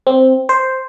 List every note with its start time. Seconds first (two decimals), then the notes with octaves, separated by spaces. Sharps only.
0.07 C4
0.49 C5